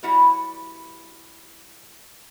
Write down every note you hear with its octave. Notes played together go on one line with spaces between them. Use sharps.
G3 E4 F#4 B4